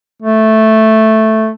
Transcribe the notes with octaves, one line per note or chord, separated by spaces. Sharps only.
A3